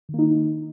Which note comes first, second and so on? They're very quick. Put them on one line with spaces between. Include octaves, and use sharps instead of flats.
D#3 A#3 D#4